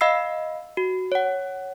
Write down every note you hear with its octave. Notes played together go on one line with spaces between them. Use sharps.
D#5 F5 B5 E6 C7
F#4
C#5 F#5